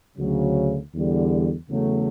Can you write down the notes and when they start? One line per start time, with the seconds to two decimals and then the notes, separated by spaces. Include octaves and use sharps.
0.17 D2 C#3 F#3
0.94 E2 D3 G3
1.69 E2 C#3 F#3 A3